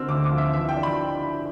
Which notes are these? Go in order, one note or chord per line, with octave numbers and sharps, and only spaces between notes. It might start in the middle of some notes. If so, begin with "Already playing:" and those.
Already playing: D3 C4 E6 F6
D2 D6
D6
F3
E5
E3 E5
G5
D4
B5